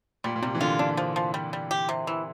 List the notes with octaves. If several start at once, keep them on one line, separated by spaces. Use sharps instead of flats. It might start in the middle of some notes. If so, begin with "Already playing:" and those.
A#2 G3
A#2
C3 G3
E3
D3 F4
D3 D4
F3
F3
G3
G3
G4
C3
E3